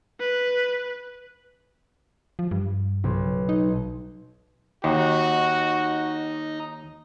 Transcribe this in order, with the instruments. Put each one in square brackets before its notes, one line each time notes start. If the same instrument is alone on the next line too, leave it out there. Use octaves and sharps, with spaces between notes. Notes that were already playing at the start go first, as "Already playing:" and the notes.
[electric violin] B4
[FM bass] F3
G2
[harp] B1
[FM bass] D#4
[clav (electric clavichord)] D#2 [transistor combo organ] D#4 [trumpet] F#4